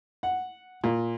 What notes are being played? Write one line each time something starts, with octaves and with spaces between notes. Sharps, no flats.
F#5
A#2